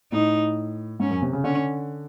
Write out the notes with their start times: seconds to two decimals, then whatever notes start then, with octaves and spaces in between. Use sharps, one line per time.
0.12 A2 D#4
1.00 G#2 C#4
1.11 F#2
1.22 C3
1.33 C#3
1.44 D3 C#4